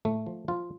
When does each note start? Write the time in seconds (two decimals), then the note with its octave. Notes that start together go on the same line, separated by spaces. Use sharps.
0.05 A2 A3
0.26 F3
0.48 F3 F4